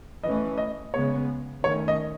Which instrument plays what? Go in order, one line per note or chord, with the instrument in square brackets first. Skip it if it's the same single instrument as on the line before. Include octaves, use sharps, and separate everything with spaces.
[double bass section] E3 A3 C#4 [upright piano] D#5
[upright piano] D#5
[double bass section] C#3 G#3 B3 [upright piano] C#5
[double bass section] D#3 [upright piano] C#5
[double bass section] A3 C#4
[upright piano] D#5